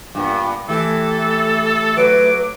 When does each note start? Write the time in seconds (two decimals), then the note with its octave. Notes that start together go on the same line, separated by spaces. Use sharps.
0.15 G2 A#2 B3
0.68 E3 A3 G4 A4
1.97 F#3 B4 D6